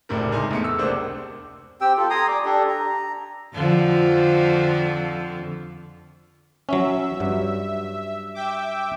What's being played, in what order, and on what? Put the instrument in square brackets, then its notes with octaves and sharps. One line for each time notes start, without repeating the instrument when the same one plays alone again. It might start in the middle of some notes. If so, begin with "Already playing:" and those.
[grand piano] F#1 A2 C3 D4 A#4
G#3 D#4 G#5 C6
E2 A3 C#7
E6
F1 C#2 A#3 D4 C5
[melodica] C4 G4 G5 E6
F4 A4
G#5 A#5 C6 D#6
D5 D6
D4 G4 A4
A#5
[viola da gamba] F2 D3 F3
[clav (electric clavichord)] F#3 C#4 [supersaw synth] E5
[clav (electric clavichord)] G2 F#3
[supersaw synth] E5 G5 D6